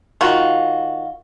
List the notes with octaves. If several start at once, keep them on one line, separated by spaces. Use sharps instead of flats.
D#3 F4 F#4